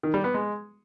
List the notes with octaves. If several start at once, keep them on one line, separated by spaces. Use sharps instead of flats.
D#3
G3
B3
G#3